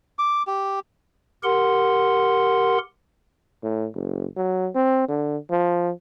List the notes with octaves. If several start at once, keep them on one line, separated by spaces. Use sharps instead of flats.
D6
G4
G4 A#4 F#5 C6
A2
F#1
F#3
C4
D3
F3